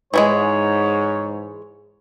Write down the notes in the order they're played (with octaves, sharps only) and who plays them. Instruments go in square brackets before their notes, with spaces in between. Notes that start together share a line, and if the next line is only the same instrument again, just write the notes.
[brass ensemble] G#2 [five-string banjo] E3 G3 G#3 [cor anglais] C#5